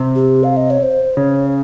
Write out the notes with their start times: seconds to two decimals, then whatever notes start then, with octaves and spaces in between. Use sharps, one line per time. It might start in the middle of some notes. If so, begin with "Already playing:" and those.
Already playing: C3
0.16 G4
0.44 F5
0.56 D#5
0.70 C#5
0.83 C5
1.16 C#3 C#5